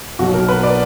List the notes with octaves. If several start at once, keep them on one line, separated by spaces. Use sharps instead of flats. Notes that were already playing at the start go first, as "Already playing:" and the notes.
B1 B2 F#3 F#4
A#4
B4
D5